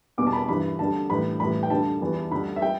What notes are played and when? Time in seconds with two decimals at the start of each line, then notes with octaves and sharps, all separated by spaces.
0.18 E2 B2 G3 D6
0.27 A5
0.33 B5
0.48 G2 E3 G3 B5
0.79 D2 D3 G3 A5
1.10 A2 E3 G3 B5
1.40 A2 E3 G3 B5
1.63 G5
1.70 D2 D3 G3 A5
2.01 E2 E3 G3
2.31 D2 D3 G3 B5
2.56 E5
2.61 G3 G5